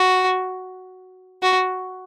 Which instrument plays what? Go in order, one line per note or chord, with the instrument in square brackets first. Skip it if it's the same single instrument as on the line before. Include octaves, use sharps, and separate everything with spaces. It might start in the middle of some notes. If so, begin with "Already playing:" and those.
Already playing: [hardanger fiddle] F#4
F#4